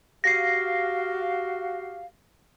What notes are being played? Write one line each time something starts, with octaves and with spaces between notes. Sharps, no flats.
F#4 G4 F5 A#6 C7